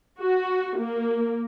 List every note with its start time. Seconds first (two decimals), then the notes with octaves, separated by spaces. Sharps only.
0.18 F#4
0.78 A#3